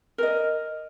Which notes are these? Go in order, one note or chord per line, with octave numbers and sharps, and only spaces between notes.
A#4 D#5